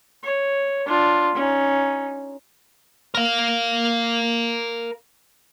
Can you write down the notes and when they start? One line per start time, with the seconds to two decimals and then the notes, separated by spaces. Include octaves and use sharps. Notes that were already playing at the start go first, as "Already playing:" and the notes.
0.23 C#5
0.86 D4 F4
1.35 C#4 D#4
3.15 A#4 F5